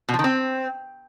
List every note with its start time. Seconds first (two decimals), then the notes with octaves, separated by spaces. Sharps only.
0.09 B2
0.14 F3
0.19 D#3
0.24 C4